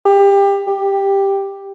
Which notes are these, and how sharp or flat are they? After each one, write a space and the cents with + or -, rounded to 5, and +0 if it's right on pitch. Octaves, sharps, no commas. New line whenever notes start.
G4 +25
G4 +5